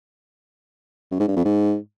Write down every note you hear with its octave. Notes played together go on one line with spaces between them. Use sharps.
F#2
G#2
G2
F2
G#2